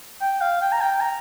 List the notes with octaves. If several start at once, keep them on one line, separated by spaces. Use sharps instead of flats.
G5
F5
G5
A#5
G5
A#5